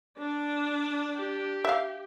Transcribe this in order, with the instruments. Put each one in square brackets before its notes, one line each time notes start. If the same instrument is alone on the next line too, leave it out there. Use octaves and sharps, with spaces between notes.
[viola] D4 D5
[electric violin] G4
[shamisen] E5 F5